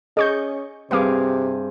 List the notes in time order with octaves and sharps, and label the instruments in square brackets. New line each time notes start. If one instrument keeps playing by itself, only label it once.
[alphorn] C#4 [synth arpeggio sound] G#4 C#6 G6 [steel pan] D#5
[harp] G2 C4 G#4 [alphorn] C3 [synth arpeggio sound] B4 F5 D6